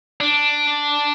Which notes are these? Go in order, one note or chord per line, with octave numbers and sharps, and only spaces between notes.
D4